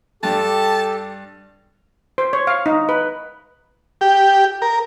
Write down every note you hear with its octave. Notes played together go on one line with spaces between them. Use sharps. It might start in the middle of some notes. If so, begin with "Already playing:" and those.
G2 G4 A4 A5
C5
C#5
F5
D#4
B4
G4
A#4